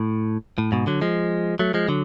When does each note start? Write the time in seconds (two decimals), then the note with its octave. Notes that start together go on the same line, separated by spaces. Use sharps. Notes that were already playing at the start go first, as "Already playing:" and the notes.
Already playing: A2
0.58 A2
0.72 G#2 B2
0.87 D3 F#3
1.02 F3 G#3
1.59 F#3 A3
1.74 F3 G#3
1.88 D3 F#3